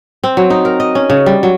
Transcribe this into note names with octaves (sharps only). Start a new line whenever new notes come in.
C4
F#3
D#4
A#4
D#5
C#4
C#3
G3
F#3